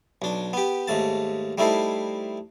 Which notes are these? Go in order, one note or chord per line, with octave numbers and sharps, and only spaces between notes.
B1 D4
B3 G4
D#2 G#2 A3 A5
G3 A3 D#4 E4 A4 C5